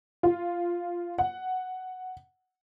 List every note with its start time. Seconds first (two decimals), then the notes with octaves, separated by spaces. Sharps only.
0.23 F4
1.18 F#5